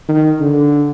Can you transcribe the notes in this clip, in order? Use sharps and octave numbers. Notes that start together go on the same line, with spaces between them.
D#3
D3